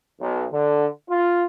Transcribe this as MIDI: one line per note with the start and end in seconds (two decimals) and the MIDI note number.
0.21 0.46 35
0.51 0.87 50
1.10 1.45 65